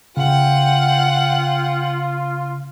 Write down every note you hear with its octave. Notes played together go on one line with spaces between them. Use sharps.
C#3 F4 F#5 G5